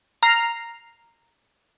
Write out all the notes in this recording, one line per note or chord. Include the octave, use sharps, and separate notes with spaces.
A#5 F6 C7